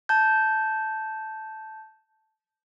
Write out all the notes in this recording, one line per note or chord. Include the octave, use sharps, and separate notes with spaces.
A5 G6